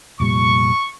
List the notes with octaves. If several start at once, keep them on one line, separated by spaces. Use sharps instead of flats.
F1 A#2 G3 C#6